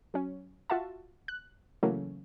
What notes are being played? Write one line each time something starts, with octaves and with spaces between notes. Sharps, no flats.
F#3 C#4
F4 F#4 E5 A5
F#6
C#3 E3 F#3 A3 A#3 C#4